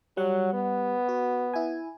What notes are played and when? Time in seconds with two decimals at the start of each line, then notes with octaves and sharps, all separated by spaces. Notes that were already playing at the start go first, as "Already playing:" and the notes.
0.17 F#3 G3 F#5
0.54 B3
1.09 F#4
1.54 E4 G#5